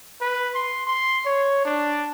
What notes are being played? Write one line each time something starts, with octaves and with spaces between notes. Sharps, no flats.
B4
C6
C6
C#5
D4